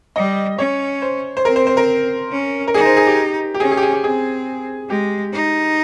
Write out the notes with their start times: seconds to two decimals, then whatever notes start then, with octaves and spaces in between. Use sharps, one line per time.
0.16 G3 D#5
0.58 C#4 C#5
1.02 C5
1.37 C5
1.45 C4 A#4
1.56 C5
1.67 C5
1.77 A#4
2.32 C#4
2.67 A#4
2.74 D#4 G#4
2.85 C5
2.97 G#4
3.07 G4
3.54 G4
3.60 C#4 G#4
3.71 G#4
3.77 G4
3.82 G#4
3.93 G4
4.04 C4 G#4
4.90 G#3 G4
5.33 D#4